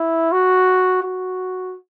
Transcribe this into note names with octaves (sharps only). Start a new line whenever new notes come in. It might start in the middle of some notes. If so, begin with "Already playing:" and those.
Already playing: E4
F#4
F#4